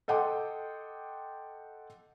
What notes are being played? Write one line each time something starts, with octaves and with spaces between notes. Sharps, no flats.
A4 D#5 F#5 G5 C6 D6